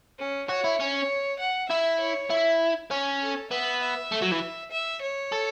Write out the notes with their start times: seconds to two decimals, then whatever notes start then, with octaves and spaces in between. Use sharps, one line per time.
0.19 C#4
0.49 F#4 C#5
0.64 E4
0.80 C#4 C#5
1.40 F#5
1.69 E4 E5
2.00 C#5
2.30 E4
2.91 C#4
3.21 A4
3.51 B3 E5
3.82 E5
4.12 A3
4.22 F#3
4.32 E3
4.72 E5
5.02 C#5
5.32 A4